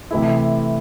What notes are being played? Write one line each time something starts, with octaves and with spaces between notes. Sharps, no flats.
C3 E3 A3 E4